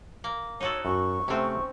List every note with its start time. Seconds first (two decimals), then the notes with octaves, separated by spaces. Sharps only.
0.24 A#3
0.60 D#4 F#4 A4 C#5
0.85 F#2 C#6
1.28 C3 A3 C4 C#4 F#5